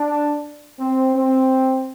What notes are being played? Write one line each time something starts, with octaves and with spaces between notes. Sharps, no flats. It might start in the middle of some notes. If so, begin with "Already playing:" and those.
Already playing: D4
C4
C4